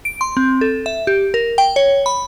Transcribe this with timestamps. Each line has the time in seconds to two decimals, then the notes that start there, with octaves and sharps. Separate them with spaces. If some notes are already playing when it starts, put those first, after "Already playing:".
0.05 D7
0.21 C6
0.37 C4
0.61 A4
0.86 E5
1.07 G4
1.34 A#4
1.58 G5
1.76 C#5
2.06 B5